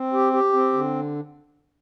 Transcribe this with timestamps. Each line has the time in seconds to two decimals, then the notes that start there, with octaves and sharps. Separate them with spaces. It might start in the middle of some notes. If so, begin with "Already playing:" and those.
Already playing: C4
0.13 G4
0.33 G4
0.53 C4
0.73 D3